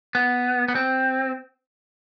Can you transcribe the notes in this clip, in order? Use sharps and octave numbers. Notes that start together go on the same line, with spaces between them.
B3
B3
C4